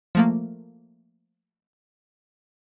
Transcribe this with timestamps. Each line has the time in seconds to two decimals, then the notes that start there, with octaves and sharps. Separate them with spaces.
0.15 F3 A3 A#3